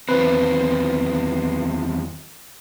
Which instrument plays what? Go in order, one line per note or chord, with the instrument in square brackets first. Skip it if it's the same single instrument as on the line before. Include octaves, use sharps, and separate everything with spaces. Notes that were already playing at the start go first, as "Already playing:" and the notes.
[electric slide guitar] E2 D#3 C4 [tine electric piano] B4